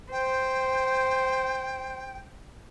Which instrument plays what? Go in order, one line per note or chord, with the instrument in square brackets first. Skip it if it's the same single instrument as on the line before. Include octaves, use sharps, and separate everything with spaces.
[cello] C5 [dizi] G5